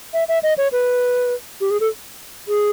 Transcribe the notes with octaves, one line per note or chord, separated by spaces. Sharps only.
E5
E5
D#5
C#5
B4
G4
G#4
A4
G#4